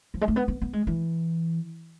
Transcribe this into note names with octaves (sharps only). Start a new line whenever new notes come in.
F3
G#3
A3
B3
B3
B3
G#3
E3